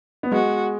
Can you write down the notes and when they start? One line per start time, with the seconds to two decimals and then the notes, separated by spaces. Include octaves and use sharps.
0.23 B3
0.31 G#3 F#4